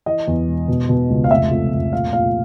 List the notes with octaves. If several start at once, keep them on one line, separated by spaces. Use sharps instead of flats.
E3 D#5
E2
E1
B2
B2
C#2
F5
F1 E5
F2
F1
A#2 F5
A#2 F5